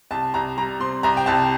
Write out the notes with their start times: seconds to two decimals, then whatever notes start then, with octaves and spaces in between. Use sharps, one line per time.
0.11 C2 A5
0.34 C2 A#5
0.57 G3 A#5
0.80 C3 C6
1.03 C2 A#5
1.17 G5
1.26 C2 A5